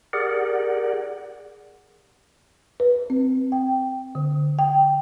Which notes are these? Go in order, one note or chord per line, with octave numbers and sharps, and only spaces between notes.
G4 G#4 A#4 D5 F#5
B4
C4
G5
D3
G5